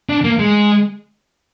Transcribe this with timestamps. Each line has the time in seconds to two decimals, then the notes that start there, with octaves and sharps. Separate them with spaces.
0.09 D4
0.24 A#3
0.39 G#3